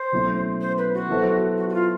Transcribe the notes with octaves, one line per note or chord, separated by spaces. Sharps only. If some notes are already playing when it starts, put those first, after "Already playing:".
Already playing: C5
B2 F#3 A3 C#4 E4
C5
B4
F#4
F#3 B3 E4 A4 C5
F#4
F#4
F4